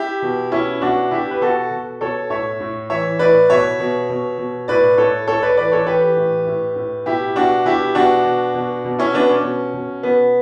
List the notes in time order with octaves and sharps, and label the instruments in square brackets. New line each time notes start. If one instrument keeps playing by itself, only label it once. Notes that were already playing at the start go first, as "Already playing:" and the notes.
Already playing: [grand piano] E4 G4
B2
B2 C#4 E4
B2 D4 F#4
B2 E4 G4
B4
B2 F#4 A4
B2
B2 A4 C#5
A2 C#5 E5
A2
E3 C#5 E5
A2 B4 D5
B2 C#5 E5
B2
B2
B2
A2 B4 D5
A2 A4 C#5
A2 A4 C#5
B4 D5
E3 B4 D5
A4 C#5
E3 G4 B4
A2
A2
A2
B2 E4 G4
B2 D4 F#4
B2 E4 G4
B2 D4 F#4
B2
B2
B2
C#4 E4
B2 B3 D4
C#4
B2
B2
B2 B3